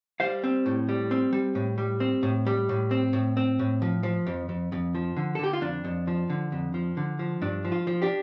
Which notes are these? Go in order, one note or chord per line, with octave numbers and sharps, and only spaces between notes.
G3 C5 F5
C4
A2
G3
C4
G3
A2
G3
C4
A2
G3
A2
C4
A2
C4
A2
F3
F3
F2
F2
F2
F3
D3
A4
D3 G4
F4
F2 D4
F2
F3
D3
F2
F3
D3
F3
G2 D4
F3
F4
F3
D4 G4